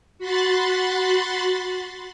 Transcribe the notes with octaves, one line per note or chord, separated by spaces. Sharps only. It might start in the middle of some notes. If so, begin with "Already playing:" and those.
F#4 B5 C6 F#6 A6